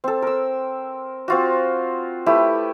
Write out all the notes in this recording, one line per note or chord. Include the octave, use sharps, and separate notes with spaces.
C4 A4
A#4 E6
C4 F4 F#4
A3 E4 G4 B4